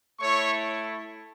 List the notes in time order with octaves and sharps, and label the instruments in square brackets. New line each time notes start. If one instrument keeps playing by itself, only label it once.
[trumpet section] A3 E4 C#5 C#6